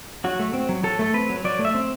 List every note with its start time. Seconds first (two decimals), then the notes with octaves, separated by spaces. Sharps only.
0.24 F#3 F#4
0.39 A3
0.53 C4
0.69 F#3
0.84 F#3 A4
0.99 A3 A4
1.14 C4 B4
1.30 F#3
1.44 F#3 D5
1.59 A3
1.65 E5
1.74 C4